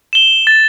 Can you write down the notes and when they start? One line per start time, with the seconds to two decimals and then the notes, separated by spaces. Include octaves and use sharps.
0.13 E7 G7
0.47 A6